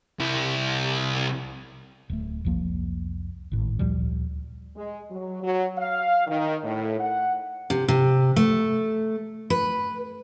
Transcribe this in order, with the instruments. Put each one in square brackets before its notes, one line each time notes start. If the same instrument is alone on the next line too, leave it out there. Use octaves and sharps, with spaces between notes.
[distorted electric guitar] C2 E4
[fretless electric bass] D1 A3
F1 C2 F3 A#3
G#1 A2
D2 A#2 F3 G3
[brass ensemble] G#3
F#3
F#3
F5
D#3
A2
F#5
[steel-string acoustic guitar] C3
C3
A3
B4